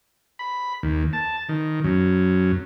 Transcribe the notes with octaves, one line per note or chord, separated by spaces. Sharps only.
B5
D#2
A5
D#3
F#2